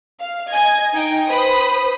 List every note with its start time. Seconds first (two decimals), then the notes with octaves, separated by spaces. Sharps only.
0.20 F5
0.51 D#5 G#5 G#6
0.93 D#4 G5
1.28 B4 C5 B5 D#6